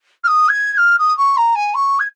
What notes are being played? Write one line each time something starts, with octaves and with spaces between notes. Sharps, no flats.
F6
D#6
G#6
G#6
F6
D#6
C#6
A#5
G#5
C#6
G#6